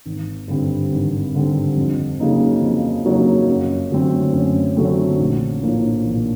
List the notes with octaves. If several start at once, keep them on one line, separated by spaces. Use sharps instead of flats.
G#1
G2 D3 G3 C4
G#1
G2 D3 G3 C4
F2
C#3 F#3 A#3 D#4
F2
C#3 F#3 A#3 D#4
F#2
D3 F#3 A3 C4
F#2
D3 F#3 A3 C4
A#1
A2 F3 A#3 D4
A#1